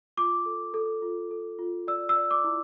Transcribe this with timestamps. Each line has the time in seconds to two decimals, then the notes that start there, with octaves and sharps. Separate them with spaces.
0.17 F4 D6
0.46 A4
0.74 A4
1.02 F4
1.31 A4
1.59 F4
1.88 D5 E6
2.09 E6
2.16 D5
2.31 D6
2.44 E4